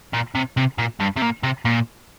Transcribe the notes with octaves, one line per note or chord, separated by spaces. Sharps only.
A#2
C3
C3
A#2
G2
C3
A#2
C3
A#2